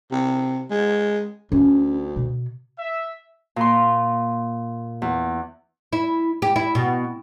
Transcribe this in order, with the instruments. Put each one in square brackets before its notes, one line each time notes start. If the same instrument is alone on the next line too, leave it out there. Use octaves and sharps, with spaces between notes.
[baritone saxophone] C3
G#3
[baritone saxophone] D2 [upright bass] C#4
[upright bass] B2
[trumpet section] E5
[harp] A#2 C6
E2
[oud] E4
G4
E4
B2